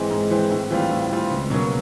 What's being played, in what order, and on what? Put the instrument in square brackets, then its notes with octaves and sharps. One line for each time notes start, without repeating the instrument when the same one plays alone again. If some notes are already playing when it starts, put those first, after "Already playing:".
Already playing: [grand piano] G#2 E3 G#3 C4
G#2
E3 G#3 C4
A2
E3 G3 C4 F4
A2
E3 G3 C4 F4
C#2
B2 F#3 A#3 C#4